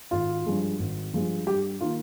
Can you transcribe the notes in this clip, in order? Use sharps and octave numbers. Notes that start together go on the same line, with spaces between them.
G#1 F4
G2 F3 G#3
G#1
G2 F3 G#3
G2 G4
D#3 A#3 F4